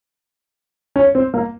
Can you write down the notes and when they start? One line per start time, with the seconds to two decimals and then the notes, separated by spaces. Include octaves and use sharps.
0.96 C#4
1.15 C4
1.34 A#3